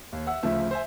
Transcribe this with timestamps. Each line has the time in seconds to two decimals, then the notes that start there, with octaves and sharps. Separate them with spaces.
0.13 D#2
0.27 E5 F#5 E6
0.43 D2 C#3 F3 A3 E5
0.71 C5 E5 G#5